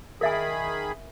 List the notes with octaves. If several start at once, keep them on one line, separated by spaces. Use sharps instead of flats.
D#3 G#4 A#4 E5 G#5 B5